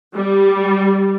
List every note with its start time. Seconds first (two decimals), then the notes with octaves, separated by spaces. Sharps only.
0.16 G3